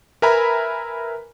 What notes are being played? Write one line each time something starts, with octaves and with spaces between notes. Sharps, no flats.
A#4 B4 E5 G#5 A#5 B5